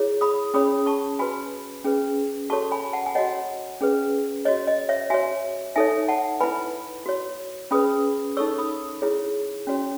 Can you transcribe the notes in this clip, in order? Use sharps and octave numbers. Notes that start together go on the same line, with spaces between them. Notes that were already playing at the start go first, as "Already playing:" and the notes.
Already playing: E4 G#4 C#5
B5 D#6
C#4 G#4 C#5 B5 D#6
A5 C#6
F#4 B4 G#5 B5
C#4 G#4 B4
F#4 A4 C#5 A5 C#6
G#5 B5
F#5 A5
G#5
F#4 C#5 D#5 F#5
C#4 G#4 B4
F#4 C#5 D#5
D#5
C#5 E5
F#4 C#5 E5 G#5
D#4 A4 C#5 E5 G#5
F#5 A5
E4 B4 G#5 B5
F#4 C#5
C#4 G#4 B4 B5 D#6
D#4 A4 C#5 C#6 E6
B5 D#6
E4 G#4 C#5
C#4 F#4 C#5